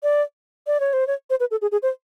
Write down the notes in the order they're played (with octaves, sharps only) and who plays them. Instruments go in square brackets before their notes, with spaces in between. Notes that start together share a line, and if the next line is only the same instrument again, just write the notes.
[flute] D5
D5
C#5
C5
C#5
C5
B4
A4
G#4
G#4
C5